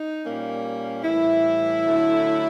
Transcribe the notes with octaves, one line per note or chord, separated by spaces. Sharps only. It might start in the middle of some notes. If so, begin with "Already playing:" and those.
Already playing: D#4
A#2 G3 A#3 C#4
A2 E3 G3 E4
D3 F#3 A3 C#4